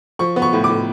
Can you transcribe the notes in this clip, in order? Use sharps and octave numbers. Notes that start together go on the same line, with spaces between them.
F3 C#6
B3
C#6
A2
D6
A2